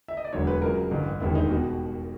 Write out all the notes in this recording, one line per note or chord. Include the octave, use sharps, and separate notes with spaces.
E5
D#5
D5
E1 D2 D3 F#3 C#5
B4
C#2 C#3 F#3 A#4
A1 G2 D3
E1 D#2 D3 G3 E4
D#4
B2 G3 F#4